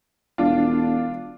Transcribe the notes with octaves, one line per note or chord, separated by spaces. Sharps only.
E1 D4 F4